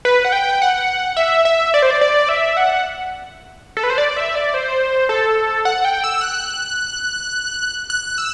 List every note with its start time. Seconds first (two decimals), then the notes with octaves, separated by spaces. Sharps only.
0.05 B4
0.25 F#5
0.32 G5
0.62 F#5
1.17 E5
1.45 E5
1.74 D5
1.82 C5
1.91 D5
2.01 D5
2.29 E5
2.57 F#5
3.77 A4
3.83 B4
3.90 C5
3.98 D5
4.17 E5
4.35 D5
4.54 C5
5.09 A4
5.65 F#5
5.85 G5
6.04 E6
6.21 F#6
7.90 F#6
8.18 E6